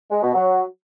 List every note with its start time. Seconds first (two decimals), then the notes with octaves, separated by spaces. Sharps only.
0.11 G#3
0.23 B2
0.35 F#3